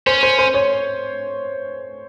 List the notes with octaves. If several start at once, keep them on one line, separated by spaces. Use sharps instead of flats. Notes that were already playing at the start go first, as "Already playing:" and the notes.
C#4 C5
C5
C5
C#5